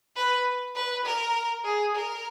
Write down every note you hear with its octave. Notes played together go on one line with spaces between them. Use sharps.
B4
B4
A#4
G#4
A#4